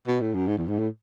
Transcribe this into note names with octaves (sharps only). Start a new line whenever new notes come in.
B2
A2
F#2
G#2
E2
G#2
A2